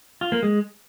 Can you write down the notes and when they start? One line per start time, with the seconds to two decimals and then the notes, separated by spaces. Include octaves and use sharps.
0.21 F4
0.32 A#3
0.43 G#3